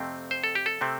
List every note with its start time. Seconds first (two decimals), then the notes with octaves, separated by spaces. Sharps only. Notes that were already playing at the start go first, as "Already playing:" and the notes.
Already playing: F2 C3 A3 C4
0.31 C5
0.44 A4
0.55 G4
0.66 A4
0.81 C3 A3 C4